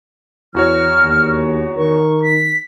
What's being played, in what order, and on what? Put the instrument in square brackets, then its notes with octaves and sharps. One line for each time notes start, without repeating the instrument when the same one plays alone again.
[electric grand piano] E2 F#4 C#5 [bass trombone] E3 [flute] F6
[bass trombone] D#2
[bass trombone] D#3 [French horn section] A#4 [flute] C#6
[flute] B6